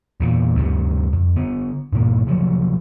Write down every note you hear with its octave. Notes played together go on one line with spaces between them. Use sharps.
E2 A#2
D2 G2 C3
F2
D3 B3
G2 A#2 D3 A#3
C3 F3 F#3